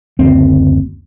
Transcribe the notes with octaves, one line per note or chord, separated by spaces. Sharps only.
F#1 D2 C4